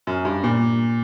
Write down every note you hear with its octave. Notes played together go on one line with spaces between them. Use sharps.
F#2
G2
A#2